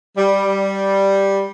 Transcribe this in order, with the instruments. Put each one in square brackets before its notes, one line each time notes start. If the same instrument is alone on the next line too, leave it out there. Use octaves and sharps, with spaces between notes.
[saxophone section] G3